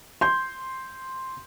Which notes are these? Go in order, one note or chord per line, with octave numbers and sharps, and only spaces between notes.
C6 G6